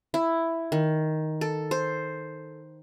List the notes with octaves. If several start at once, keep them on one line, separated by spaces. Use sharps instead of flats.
E4
D#3
A4
C5